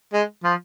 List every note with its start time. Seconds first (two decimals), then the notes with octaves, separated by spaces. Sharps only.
0.13 G#3
0.44 F3